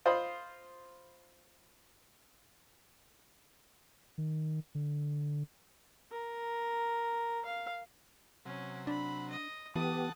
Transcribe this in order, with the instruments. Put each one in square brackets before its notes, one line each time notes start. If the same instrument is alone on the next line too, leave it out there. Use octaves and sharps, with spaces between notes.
[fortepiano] F4 C5 D#5 B5
[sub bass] D#3
D3
[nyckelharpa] A#4
F5
[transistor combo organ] C3 F#3 [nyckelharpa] C#4
[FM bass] D4 [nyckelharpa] B5
[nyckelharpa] D#5
[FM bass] E3 [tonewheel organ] B3 G4 [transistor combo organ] A4 F#5 A5 [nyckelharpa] D#6